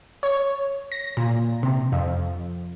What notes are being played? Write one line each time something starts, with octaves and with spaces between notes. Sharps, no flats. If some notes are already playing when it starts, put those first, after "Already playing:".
C#5
A#6
A#2
C3
F2